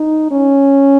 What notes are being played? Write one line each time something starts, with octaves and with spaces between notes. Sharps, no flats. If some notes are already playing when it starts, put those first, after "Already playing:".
Already playing: D#4
C#4